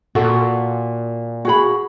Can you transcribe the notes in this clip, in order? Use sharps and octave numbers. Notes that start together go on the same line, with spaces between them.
A#2 F#4 A4 F#5
F#4 G#4 B5